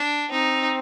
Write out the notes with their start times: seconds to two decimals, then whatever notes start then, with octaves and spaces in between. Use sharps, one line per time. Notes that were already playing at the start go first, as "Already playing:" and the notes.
Already playing: D4
0.31 C4 D#4